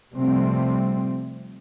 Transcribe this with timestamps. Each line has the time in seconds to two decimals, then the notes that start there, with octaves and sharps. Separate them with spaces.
0.14 C3 F3 G3 A3 C4